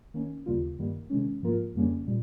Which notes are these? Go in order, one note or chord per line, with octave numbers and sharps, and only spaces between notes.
D#3 A#3 C#4
D#2 C#3 G3 A#3 F4
G2 D#3 G3 A#3
C3 D#3 G#3 C#4
G#2 F3 A#3 F4 A#4
F2 C#3 G3 A#3 C#4
A#2 G3